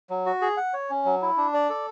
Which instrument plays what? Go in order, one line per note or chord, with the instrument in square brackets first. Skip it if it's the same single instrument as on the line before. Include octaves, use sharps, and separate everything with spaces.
[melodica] F#3
F#4
G#4
F#5
C#5
C#4
F#3
E4
D4
D5
A4